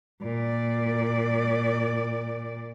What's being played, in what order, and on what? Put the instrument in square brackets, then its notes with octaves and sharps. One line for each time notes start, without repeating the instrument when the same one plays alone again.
[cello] A#2 D5